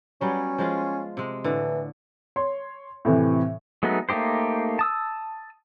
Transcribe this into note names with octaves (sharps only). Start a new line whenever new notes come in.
F#3 G3 B3 C#4
F3 G#3 F4
C3 G#3
A2 D3 E3
C#5 C6
A2 C3 E3
F#3 G#3 A3 B3 D#4
A3 A#3 D#4 G4 C5
A5 D#6 E6